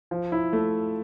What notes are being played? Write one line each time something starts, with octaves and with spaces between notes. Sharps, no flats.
F3
E4
A3